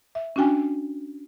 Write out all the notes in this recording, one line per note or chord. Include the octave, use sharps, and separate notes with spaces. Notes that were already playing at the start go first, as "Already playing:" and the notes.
E5
C#4 D4 F#4 G5 G#5